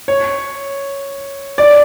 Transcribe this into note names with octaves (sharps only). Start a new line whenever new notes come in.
C#5
D5